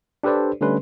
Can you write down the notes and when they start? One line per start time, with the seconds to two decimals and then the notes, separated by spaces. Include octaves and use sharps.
0.23 D4 G4 A4 B4 C5 D5
0.61 D3 G3 A3 C#4 B4 C6